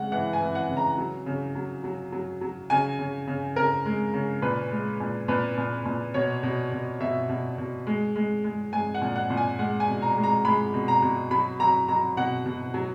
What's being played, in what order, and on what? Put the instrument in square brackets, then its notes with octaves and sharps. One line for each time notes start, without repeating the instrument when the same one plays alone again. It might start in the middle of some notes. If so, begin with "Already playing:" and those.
Already playing: [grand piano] C#3 G#3 F#5
E3 F#5
G#5
E3
F#5
C#3
A#5
F#3
C#3
F#3
F#3
F#3
F#3
C#3 G#5
C#3
C#3
C#3 A#4
G#3
C#3
A#2 B4
G#3
A#2
A#2 B4
A#2
A#2
B2 C#5
B2
B2
B2 E5
B2
B2
G#3
G#3
G#3
G#3 G#5
F#5
A#2
F#5
A#2
G#5
G#3 F#5
G#5
B2
A#5
G#3
A#5
G#3 B5
B2
A#5
B2
F#3 B5
F#3 A#5
F#3 A#5
B2 F#5
B2
F#3